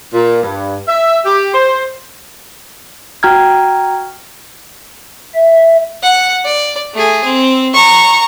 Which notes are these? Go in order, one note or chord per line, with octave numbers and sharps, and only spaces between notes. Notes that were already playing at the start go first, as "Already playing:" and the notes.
A#2
G2
E5
G4
C5
F#4 G5 A#5 F6 G#6
E5
F#5
D5
A3 G#4
C4
A#5 C#6